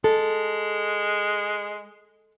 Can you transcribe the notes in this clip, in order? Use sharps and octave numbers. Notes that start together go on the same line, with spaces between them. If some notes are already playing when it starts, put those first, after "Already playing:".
G#3 A4